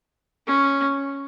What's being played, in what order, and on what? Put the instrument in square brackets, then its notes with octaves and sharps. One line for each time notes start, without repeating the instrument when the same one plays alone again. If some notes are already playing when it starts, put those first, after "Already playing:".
[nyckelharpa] C#4